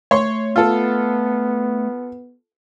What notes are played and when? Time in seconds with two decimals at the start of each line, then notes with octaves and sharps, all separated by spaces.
0.11 A3 C#5 C6 C#6
0.56 B3 F4 A4